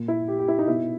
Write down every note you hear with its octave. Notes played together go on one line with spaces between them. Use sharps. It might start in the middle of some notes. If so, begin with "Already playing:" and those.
Already playing: A#2
E4
G4
G4
E4
D#4
B2 E4